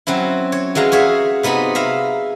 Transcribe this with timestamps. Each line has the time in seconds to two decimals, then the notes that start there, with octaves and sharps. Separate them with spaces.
0.07 F#3 C4 C#4 E4
0.52 C#5
0.75 E3 F#3 G#3 F5 A#5
0.92 F#4 G#4 C#5 E5 F5
1.43 C3 B3 D#4 G#4 B5
1.75 E5 F5 A#5 B5